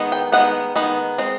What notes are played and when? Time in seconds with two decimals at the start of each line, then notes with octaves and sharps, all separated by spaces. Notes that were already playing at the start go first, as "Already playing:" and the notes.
Already playing: D#3 G#3 B3
0.12 G5
0.32 D#3 G#3 B3 F#5
0.76 D#3 G#3 B3
1.18 G#3 C4